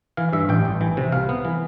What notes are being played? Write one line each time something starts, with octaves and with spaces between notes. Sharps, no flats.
E3 F5
G2 E5
A1 G5
A1
E3
C3
C2 F5
B3
E3